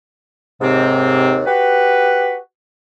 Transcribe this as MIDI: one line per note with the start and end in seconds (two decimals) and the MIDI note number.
0.61 1.41 39
0.61 1.41 44
0.61 1.41 48
0.61 1.41 60
1.47 2.36 66
1.47 2.36 67
1.47 2.36 71